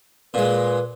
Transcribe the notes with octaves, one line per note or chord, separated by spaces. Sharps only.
A#2 G#3 B4